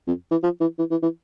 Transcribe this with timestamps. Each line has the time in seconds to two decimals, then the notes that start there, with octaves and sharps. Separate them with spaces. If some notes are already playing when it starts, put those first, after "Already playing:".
0.07 F2
0.31 E3
0.43 F3
0.61 E3
0.79 E3
0.91 E3
1.03 E3